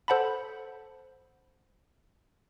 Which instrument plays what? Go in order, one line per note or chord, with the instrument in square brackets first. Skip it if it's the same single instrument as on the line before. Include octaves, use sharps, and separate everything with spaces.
[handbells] A4 C5 F#5 A5 B5